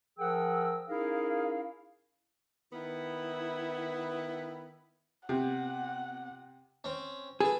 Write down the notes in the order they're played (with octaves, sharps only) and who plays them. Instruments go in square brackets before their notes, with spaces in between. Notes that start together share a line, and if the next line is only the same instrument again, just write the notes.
[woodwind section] F3 G#4 A#4 F#5 G5 E6
C#4 D#4 E4 G#4 A#4 F5
[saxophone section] D#3 B3 [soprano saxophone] E4
[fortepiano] C3 [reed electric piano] B3 C4 F4 [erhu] F#5
[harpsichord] C4 C#4
[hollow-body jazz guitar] G#4 [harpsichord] A4 B4